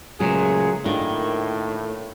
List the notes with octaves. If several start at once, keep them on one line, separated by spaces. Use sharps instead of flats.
C#2 A#2 F#3 A3 G#4
A2 D#3 A#3 D4 F4